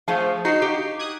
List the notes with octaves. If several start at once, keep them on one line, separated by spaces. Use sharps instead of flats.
F3 A3 G#4 F5
D#4 F#4 C7
G4
D#6 F#6 G#6